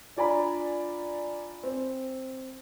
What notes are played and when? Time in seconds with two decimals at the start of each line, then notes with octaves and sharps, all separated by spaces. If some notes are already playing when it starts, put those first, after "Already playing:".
0.17 D4 F4 D5 G#5 A#5 B5
1.63 C4